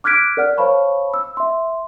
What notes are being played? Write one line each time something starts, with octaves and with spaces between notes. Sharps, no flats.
D6 F6 F#6 G#6 B6 D7
A#4 D5 F#5 F6
C5 C#5 F5 A5 B5 C#6
E6
E5 C6